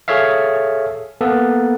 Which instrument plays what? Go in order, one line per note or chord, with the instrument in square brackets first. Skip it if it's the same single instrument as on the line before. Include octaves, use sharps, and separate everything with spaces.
[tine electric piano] G#4 A4 C#5 E5 F5
A#3 B3 A4